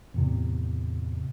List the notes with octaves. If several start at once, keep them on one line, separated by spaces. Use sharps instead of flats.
E2 A2 C3